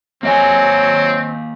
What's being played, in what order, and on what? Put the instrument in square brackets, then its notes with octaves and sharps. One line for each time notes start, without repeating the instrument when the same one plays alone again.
[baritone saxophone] F#3 [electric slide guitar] A#3 D#5 G#5 [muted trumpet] C4